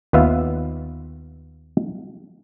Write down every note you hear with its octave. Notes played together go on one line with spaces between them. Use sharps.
D#2 B3 F4 B4 E5 F5